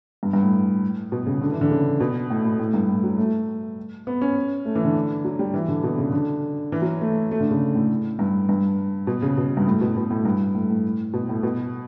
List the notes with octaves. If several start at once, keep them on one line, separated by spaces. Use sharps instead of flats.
G2
G2
A2
B2
C#3
D3
E3
D3
C#3
B2
A2
A2
A2
G2
A2
F#3
A3
B3
C#4
A3
E3
D3
F#3
G3
E3
D3
B2
C#3
D3
E3
F#3
A3
A3
D3
C#3
A2
G2
G2
B2
C#3
B2
G2
A2
B2
B2
A2
G2
A2
A2
B2
A2
B2